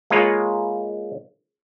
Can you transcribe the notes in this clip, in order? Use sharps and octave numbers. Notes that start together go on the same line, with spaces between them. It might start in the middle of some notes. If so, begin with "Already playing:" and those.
G#3 A#3 F4 B4 C#5